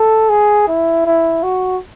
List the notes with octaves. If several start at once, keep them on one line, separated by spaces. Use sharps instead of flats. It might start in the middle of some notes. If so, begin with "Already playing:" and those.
Already playing: A4
G#4
E4
E4
F#4